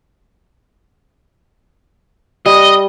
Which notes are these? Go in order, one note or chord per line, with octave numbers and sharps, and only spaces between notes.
G3 D#5